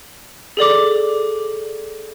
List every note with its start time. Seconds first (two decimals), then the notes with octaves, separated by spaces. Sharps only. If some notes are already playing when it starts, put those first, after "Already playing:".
0.57 G#4 A4 D5 D6